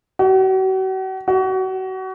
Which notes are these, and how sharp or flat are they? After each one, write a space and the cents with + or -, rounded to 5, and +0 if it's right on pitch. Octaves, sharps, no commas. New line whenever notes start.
F#4 +40
F#4 +30